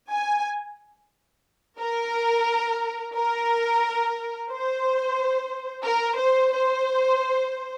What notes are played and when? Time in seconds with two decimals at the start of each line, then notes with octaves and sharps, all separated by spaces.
0.11 G#5
1.80 A#4
3.15 A#4
4.50 C5
5.85 A#4
6.18 C5
6.52 C5